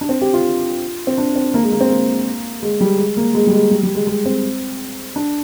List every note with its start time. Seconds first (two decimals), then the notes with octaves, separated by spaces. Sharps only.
0.01 D4
0.09 C4
0.21 G4
0.34 F4
1.07 C4
1.18 D4
1.36 C4
1.54 A#3
1.63 G#3
1.72 A#3
1.81 C4
1.90 A#3
2.63 G#3
2.81 G3
2.98 G#3
3.17 A#3
3.35 G#3
3.47 G3
3.53 G#3
3.71 G3
3.83 G3
3.95 G#3
4.07 G#3
4.26 C4
5.16 D4